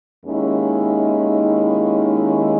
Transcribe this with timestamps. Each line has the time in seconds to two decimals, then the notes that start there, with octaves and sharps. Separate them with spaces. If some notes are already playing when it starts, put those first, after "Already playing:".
0.24 D#2 D#3 G#3 C#4 E4